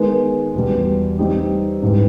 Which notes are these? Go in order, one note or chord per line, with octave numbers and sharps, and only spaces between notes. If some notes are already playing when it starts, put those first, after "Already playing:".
Already playing: D#3 G#3 B3
E2 B2 G3
G3 C4 D#4 G4
G#2 E3 G3